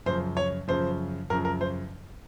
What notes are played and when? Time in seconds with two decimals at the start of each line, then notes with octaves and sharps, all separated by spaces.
0.06 F#2 C#3 F3 C5
0.37 C#5
0.68 F#2 C#3 F3 C5
1.30 F#2 C#3 F3 A#4
1.45 A#4
1.61 C5